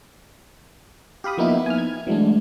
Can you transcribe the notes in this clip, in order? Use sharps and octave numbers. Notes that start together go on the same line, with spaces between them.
G4 F5 B5 D#6
F3 A#3 B3 D#4 E4
G#5 F6
G#6
E3 F#3 G#3 A3 D4